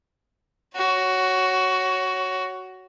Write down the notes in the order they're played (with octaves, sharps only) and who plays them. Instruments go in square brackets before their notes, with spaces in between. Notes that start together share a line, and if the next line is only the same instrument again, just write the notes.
[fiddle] F#4 C#5